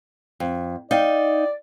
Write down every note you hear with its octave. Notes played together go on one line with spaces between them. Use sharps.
F2
D#4 D5 F5 G5